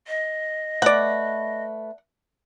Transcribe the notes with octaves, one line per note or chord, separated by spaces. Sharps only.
D#5
A3 B4 D5 F#5